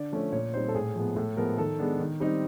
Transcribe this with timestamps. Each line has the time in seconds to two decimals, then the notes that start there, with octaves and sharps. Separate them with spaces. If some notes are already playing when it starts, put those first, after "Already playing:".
Already playing: D3 D5
0.12 F3 A3 C#4
0.32 A#2 C#5
0.54 G3 C4 D#4 C5
0.68 A4
0.75 A2 G#4
0.95 F3 G#3 B3
1.16 A2 A4
1.37 F3 G#3 B3 A#4
1.57 D#3 A4
1.79 G#3 B3 D4
2.00 D#3
2.20 G3 C4 D#4